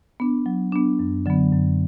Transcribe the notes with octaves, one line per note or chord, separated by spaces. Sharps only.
B3 D4
F#3
B3 D4
F#2
D3 F#3 B3
F#2